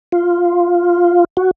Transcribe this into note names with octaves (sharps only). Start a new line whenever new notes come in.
F4
F#4